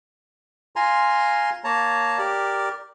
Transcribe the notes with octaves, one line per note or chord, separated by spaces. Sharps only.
F4 G#5 A#5 C6
A#3 C#5 A5 A#5
G4 A#4 D5